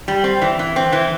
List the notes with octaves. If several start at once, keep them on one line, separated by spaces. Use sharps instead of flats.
G3
C4
E3
E3
C4
E3